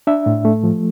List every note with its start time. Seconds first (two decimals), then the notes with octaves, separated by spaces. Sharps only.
0.07 D4 E5
0.26 A2
0.45 A3
0.63 F3